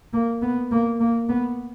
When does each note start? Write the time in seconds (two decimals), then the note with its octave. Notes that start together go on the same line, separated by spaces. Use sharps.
0.13 A#3
0.42 B3
0.71 A#3
1.00 A#3
1.29 B3